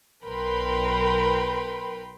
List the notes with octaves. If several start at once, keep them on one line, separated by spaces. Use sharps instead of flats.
B1 A#4 B4 G5 B5 C6